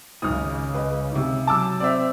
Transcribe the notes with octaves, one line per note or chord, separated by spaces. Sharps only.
G#1 C#2 C#3 D#6 F6
B4 D#5
G#2 C3
F#3 A5 D6 E6
C4 D5 E5